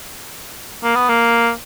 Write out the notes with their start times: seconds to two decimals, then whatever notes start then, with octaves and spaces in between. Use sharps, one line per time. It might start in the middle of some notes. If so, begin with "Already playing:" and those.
0.83 A#3
0.95 B3
1.09 A#3